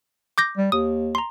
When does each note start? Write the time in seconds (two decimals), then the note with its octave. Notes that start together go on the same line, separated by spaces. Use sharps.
0.38 D6 G6 A#6
0.58 G3
0.72 D#2 D#6
1.15 A#5 C6